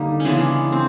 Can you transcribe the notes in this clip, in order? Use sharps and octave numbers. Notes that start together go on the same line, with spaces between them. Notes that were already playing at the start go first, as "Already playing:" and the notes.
Already playing: D3 G3 A#3 D#4
C#4
C#3 E3 G#3 B3 D4
C4